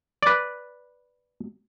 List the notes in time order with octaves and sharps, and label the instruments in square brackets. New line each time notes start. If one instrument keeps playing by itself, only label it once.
[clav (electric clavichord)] B4 D5